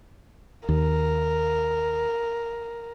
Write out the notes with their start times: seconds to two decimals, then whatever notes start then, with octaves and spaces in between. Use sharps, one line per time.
0.69 D#2 A#4